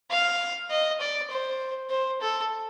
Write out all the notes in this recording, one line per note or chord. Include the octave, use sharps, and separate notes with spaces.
F5
D#5
D5
C5
C5
A4